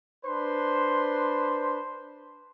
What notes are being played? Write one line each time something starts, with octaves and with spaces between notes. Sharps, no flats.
D4 B4 C5 C6